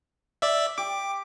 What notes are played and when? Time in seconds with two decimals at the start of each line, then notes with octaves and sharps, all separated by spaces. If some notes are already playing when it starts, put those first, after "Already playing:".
0.42 D5 E5
0.78 G4 D6